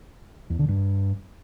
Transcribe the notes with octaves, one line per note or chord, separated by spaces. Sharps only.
E2
D3
G2